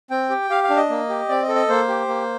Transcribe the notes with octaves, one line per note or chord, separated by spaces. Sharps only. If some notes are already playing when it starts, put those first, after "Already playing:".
C4 G5
G4
G4 F5
F5
D4
D#5
A#3
G4
C4 D5
D#5
A4
D#5
A#3 C5
G4
A#3